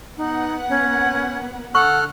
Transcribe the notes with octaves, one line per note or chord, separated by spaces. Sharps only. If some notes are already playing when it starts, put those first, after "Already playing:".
B3 D#4 F#5
C#4
D3 A4 F#5 C#6 F6 F#6